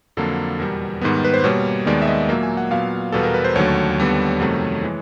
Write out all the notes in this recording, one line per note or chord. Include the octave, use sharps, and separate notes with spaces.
F2 D3 F#3 A#3 A4
E2 B2 G3 A#4
G#2 D#3 G3 B3
B4
C5
B2 G3 A#3 C#5
D#2 D#3 G#3 B3 D5
E5
D#5
A#2 F#3 A#3 E5
G#5
F#5
A#2 F#3 B3 F5
E2 B2 G3 B3 A4
A#4
B4
C5
D#2 D3 F#3 A3 C#5
D#2 D3 G3 B3
F2 C3 D#3 F#3 A3
E3 G#3